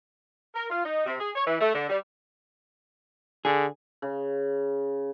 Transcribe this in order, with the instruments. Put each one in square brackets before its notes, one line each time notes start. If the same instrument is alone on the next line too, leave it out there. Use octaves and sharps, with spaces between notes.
[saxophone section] A#4
F4
D#4
C3
G#4
C#5
E3
A3
D3
G3
[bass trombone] D3 [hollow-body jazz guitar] G#4
[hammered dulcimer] C#3